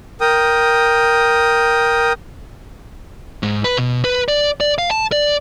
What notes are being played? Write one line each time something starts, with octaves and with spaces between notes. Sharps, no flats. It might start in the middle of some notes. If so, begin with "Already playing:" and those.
A#4 G5 D#6
G#2
B4
B2
B4
D5
D5
F5
A5
D5